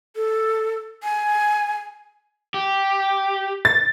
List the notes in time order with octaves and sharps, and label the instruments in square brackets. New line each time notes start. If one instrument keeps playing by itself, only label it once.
[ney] A4
G#5
[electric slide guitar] G4
[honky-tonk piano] A6